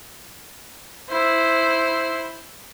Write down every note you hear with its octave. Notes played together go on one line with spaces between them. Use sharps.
E4 C5